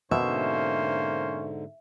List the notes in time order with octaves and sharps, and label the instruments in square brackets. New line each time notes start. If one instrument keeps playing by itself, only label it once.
[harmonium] G#2 D3 [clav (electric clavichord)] B2 [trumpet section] A#3 C#4 C5 [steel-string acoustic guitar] E5